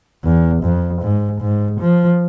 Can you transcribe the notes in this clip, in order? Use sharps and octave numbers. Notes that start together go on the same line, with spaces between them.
E2
F2
G#2
G#2
F3